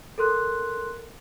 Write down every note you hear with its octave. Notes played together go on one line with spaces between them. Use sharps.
A4 A#4 C6 F#6